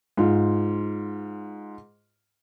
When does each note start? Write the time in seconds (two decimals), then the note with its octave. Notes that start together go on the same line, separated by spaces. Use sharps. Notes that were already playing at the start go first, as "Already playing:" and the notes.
0.17 G#2 F4